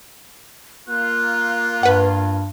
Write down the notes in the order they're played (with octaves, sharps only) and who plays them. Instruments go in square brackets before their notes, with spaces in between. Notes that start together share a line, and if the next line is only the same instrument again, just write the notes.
[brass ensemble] A#3 F4 [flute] F#6
[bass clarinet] G2 [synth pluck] B4 F#5